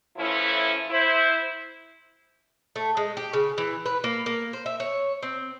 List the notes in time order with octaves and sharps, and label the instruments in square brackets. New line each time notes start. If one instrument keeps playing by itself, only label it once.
[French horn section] A2 E3 F3 C#4 E4
E4 C5
[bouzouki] A3
G#3
G4
C#3
E3
B4
A#3
A#3
C5
E5
C#5
C4